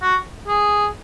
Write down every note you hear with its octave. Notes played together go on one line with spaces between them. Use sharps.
F#4
G#4